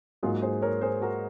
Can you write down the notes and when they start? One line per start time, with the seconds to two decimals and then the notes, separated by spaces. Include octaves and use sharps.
0.23 G#2 F#3 A#3 F4 G#4
0.42 G#4 C5
0.62 A#4 C#5
0.81 G#4 C5
1.01 F#4 A#4